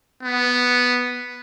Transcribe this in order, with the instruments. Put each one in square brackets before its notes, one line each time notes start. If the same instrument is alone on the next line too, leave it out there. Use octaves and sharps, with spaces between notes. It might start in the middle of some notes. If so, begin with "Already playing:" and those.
[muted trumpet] B3